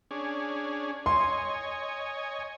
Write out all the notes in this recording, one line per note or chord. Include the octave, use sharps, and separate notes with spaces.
C#4 D4 G#4
C#5 D#5 G#5 C6